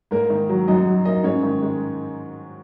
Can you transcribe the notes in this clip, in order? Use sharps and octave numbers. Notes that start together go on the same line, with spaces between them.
G#2 A#3 A#4
D#3
F#3
F#2 D#4 D#5
F#3
A#3 D#4 D#5
G#2 C#4 C#5
D#3
G#3